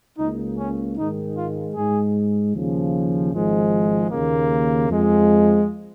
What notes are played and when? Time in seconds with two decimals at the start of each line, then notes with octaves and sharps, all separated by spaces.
0.18 C#2 C#3 A#3 D#4
0.58 C#4
0.97 G#2 D#3 G#3 D#4
1.36 F4
1.75 G#2 G#3 G#4
2.54 D#2 C#3 F3
3.33 G#1 G#2 F3 G#3
4.11 D#2 C#3 A#3
4.89 F2 F3 G#3